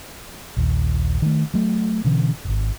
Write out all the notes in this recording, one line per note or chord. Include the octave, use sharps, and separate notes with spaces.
A#1 D#2
D#3 A3
F#3 A3
B2 D3 E3 C#4
D1 G#1